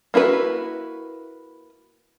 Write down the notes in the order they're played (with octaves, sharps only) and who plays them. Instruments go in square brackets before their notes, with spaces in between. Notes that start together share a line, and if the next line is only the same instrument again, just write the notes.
[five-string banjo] A#3 E4 F#4 B4